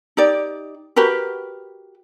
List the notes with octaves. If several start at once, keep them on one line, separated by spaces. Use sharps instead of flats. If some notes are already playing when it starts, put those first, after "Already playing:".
D#4 G4 D5
F#4 G4 A#4 B4